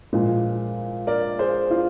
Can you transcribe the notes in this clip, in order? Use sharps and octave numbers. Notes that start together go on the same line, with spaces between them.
A#2 F3 G#3
A#4 D5
G#4 C5
F4